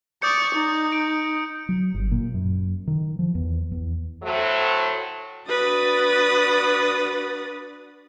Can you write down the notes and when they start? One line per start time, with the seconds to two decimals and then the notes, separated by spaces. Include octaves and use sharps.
0.22 D5 C#6 D#6 G6 C#7
0.55 D#4
0.92 D7
1.69 F#3
1.94 G1
2.11 A#2
2.34 F#2
2.87 D#3
3.19 F3
3.35 E2
3.72 E2
4.23 A2 F#3 A3 F#4 C5
5.47 D4 F#4 B4 D#6 A6